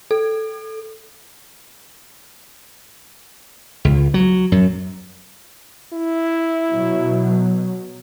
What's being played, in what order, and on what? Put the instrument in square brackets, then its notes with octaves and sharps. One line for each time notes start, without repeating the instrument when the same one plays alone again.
[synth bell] A4
[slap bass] C#2
F#3
F#2
[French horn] E4
[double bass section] B2 F#3